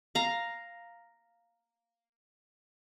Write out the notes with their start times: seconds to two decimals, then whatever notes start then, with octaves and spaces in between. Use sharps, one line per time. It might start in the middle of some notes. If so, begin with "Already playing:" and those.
0.15 F5 A#5